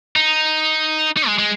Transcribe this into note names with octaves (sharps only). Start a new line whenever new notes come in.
D#4
D#4
G#3
G#3